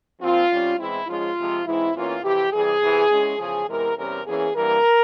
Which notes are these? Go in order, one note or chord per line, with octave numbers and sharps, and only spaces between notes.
A#2 F3 C4 F4
C3 G3 C#4
E2 E3 G#3 C4 E4
G#2 F3 G#3 C#4 F4
C3 F3 G#3
G#2 E3 G#3 C4 E4
E2 E3 A#3 C#4 F4
F2 C3 E3 G4
C3 E3 G3 G#4
E2 C3 E3
E2 E3 G#3 C#4
E2 C#3 F3 G#4
E2 C3 E3 G#3 A#4
E2 C3 G3 C#4 A#4
E2 E3 A#3 C#4 G#4
G2 E3 G3 A#3 A#4